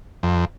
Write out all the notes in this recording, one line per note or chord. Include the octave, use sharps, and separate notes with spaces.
F2